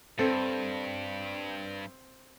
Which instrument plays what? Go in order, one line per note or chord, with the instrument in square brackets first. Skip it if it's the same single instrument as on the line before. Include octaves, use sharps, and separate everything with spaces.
[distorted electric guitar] G2 [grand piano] C4 [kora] A4